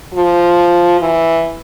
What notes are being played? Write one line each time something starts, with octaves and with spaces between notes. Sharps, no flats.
F3
E3